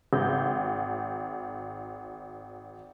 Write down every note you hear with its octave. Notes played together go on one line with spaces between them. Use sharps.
G#1 G6